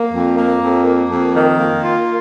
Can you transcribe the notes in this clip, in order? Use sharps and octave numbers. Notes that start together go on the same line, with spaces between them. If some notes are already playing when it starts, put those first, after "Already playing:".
Already playing: A#3
F2
A#3
F2
A#3
F2
D#3
A#3
F4